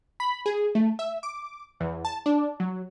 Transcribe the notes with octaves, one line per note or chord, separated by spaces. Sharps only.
B5
G#4
A3
E5
D6
E2
A5
D4
F#3